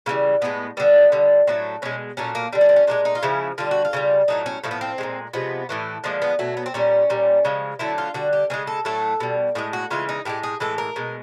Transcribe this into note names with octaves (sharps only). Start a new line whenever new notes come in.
C#3 E3 G3 A#3
A2 E3 G#3 B3
D3 G3 B3
D3 G3
A2 F#3 A3 C4
B2 G#3 C#4
A#2 F#3 A3 C#4
A#3
D3 G3 D4
C#4
C4
C#4
A#2 F3 G#3 D4
D#4
F4
C#3 F3 G#3 E4
D3 G3 F4
F#4
F4
C#3 E3 G3
A2 F#3 A3 D#4
C#4
A2 F3 A3
B3
C4
A#2 F3 G#3
C3 F3 G#3 B3
A2 E3 A3
D3 F3 G#3 A#3
B3
B2 F#3 A3
B3
C4
A#2 G3 C#4
A#2 G3
C#3 F3 G#3
D3 F#3 A3 E4
F4
D3 G3 F#4
G4
C#3 F3 G#3 G#4
A4
A2 F#3 A3 A4
B2 G3
A2 F3 G#3 G#4
F#4
C#3 E3 G#3 F4
D#4
A2 F3 G#3 G4
G#4
A2 E3 G#3 A4
A#4
B2 G#3